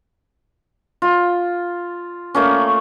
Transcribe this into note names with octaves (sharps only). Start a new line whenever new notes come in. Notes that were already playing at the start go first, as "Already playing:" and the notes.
F4
A3 A#3 C#4